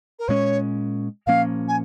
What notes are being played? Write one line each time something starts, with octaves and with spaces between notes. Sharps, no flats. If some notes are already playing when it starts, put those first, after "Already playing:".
A#4
A#2 G#3 C#4 C#5
A#2 F3 A#3 C#4 F5
G#5